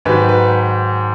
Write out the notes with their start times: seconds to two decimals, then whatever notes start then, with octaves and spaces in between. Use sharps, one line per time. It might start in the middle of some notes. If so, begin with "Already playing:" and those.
0.05 G#2 D#3 F#3 B4
0.29 B4